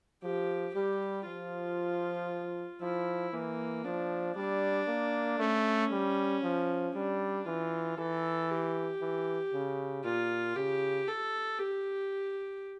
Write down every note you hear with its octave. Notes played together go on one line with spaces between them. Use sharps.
F3 G4
G3 G4
F3 F4
F3 E4
E3 A#3
F3 D4
G3 D4
A#3
A3 C#4
G3
F3
G3 D4
E3 F4
E3 A4
G4
E3
C#3
A#2 F4
C#3 G4
A4
G4